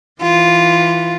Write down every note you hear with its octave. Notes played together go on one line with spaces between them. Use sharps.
E3 F4